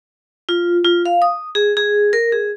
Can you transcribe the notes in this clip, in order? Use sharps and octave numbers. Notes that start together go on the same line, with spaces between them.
F4
F4
F5
D#6
G#4
G#4
A#4
G#4